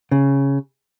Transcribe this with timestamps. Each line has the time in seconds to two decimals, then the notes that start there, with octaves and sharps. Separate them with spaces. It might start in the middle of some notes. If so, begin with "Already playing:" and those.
0.11 C#3